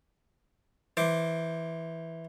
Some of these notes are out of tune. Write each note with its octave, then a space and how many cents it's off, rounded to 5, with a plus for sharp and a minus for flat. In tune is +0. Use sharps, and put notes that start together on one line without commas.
E3 -5 C5 +0 D6 +0